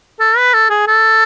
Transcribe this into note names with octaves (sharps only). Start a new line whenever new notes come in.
A4
B4
A4
G#4
A4